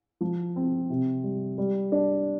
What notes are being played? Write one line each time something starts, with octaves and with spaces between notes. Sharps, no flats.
F3
C4
C3
G3
G3
D4